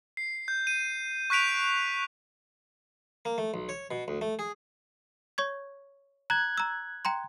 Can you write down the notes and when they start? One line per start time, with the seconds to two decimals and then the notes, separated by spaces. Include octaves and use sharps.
0.17 C7
0.48 G6
0.67 D#7
1.30 C#6 F#6 B6 D7 F7
3.25 A#3
3.38 A3
3.54 B1
3.69 C#5
3.91 B2
4.08 D2
4.21 A3
4.39 G#4
5.38 C#5 C#6 G#6
6.30 A#5 F#6 G#6
6.58 A#5 E6
7.05 G5 A#5 C6